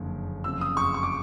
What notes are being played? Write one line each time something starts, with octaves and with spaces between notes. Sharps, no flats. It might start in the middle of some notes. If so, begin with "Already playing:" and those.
Already playing: F#1 F2 D3
F#1 F2 C#3 E6
D#6
C#6
C#6
D6